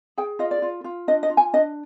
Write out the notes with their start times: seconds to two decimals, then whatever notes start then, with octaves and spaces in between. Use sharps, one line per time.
0.18 G#4 G5
0.39 F4 D#5
0.51 D5
0.62 F4
0.84 F4
1.08 D4 D#5
1.23 D#5
1.30 F4
1.37 G#5
1.53 D4 D#5